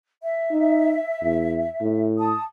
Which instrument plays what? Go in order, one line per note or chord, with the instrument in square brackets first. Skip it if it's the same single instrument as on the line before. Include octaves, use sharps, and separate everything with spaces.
[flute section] E5
[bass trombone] D#4
E2
A2
[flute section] A5 D#6